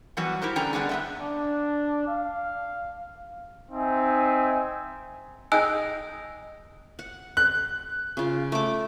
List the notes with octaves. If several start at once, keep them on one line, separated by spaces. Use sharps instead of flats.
E3 F#3 G3 B3 F#4
E4 G4 A#4 C5
D3 G3 C#4 G5 A#5
D3 B3 D4 G#4
B3 C4 E5
D4
F5
C4 D#4 E5 G#5
D#4 G#4 G5 G#5 E6 F#6
F#5
F#6
C#3 F4
A3 D6